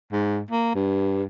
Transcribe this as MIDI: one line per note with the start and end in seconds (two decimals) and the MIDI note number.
0.12 0.41 44
0.51 0.74 58
0.75 1.24 43